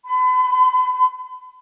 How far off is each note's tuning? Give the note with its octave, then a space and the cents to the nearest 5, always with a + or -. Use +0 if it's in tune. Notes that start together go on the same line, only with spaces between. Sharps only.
B5 +40